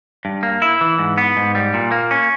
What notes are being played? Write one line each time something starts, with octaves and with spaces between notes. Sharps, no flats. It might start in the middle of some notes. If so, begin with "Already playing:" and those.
G2
A#3
E4
E3
G#2
B3
G#2
G3
A#2
A#3
C#4